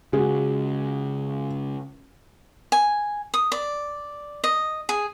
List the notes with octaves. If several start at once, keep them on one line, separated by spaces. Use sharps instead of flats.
C#3 G#3 F#4 G#4
G#5
D#6
D5
D#5
G#4